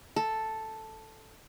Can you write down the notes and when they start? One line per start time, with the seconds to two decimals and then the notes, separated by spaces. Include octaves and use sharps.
0.16 A4